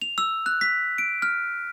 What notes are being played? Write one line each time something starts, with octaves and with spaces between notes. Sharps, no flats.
F7
E6
F#6
B6
D7
F6